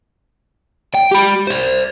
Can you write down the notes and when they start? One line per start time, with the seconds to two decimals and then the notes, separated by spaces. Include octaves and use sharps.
0.94 G5
1.11 G4 B5
1.47 C5 D5